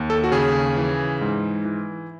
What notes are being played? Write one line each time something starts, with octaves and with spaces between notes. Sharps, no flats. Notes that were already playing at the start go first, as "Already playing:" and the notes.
Already playing: D#2
A4
F#4
C#3 G#4
E3
G#2
E3